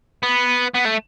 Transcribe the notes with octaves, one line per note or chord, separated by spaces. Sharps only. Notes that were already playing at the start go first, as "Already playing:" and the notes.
B3
B3
A3